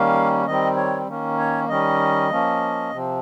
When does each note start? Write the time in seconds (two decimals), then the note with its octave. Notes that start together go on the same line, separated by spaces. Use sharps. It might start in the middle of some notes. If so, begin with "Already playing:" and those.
Already playing: D#3 G3 A#3 C#4 F5
0.46 D#3 G3 C4 D#5
0.76 C#5
1.07 D#3 A#3 C#4
1.39 C#5
1.69 D#3 G3 C#4 D#5
2.30 F3 A#3 C#4
2.91 C3 F3 C4